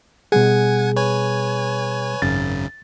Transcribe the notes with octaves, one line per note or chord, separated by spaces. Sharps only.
B2 G3 G#4 F#5 G#5 G#6
B4 C#5 G#5
G#1 F#2 C#3 A6